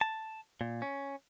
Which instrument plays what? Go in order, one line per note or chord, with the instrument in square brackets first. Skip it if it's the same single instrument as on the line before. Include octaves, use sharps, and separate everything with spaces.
[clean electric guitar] A5
A#2
C#4